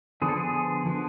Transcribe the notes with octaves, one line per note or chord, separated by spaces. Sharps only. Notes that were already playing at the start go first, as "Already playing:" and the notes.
D3 F3 B3 G#4
A4
G#4
D3 F3 B3